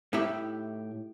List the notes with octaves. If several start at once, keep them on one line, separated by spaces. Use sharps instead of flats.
A2 D#4 E4 G4 E5